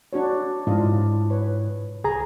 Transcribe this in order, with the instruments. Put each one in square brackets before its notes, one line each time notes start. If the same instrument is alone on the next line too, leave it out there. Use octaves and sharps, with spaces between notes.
[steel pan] D4 F#4 C#5
[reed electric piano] G#2 E4 [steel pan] D4 F4 D#5
[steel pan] B4 C#5
[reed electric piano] C2 G#4 A#5